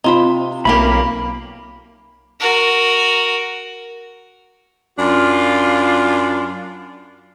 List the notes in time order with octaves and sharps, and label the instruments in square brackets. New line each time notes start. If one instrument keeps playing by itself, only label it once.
[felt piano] C3 F4 [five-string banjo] D#4 C5 B5
[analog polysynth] B1 A#3 [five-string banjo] A3 C#4 G4 [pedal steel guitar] B5
[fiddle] F#4 A#4
[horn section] F#2 D4 F4